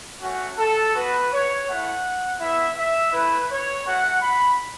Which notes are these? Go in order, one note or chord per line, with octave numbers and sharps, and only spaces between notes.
A3 C#4 F#4
A4
B3 F#4 B4
C#5
A3 E4 F#5
B3 E4 E5
E5
A3 E4 B4
C#5
A3 F#4 F#5
B5